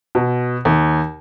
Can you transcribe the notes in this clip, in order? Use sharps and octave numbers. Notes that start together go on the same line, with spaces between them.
B2
D#2